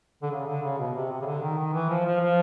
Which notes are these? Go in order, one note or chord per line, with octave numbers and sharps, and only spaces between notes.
D3
C#3
D3
C#3
B2
C3
C3
C#3
D3
D#3
D#3
E3
F3
F3
F3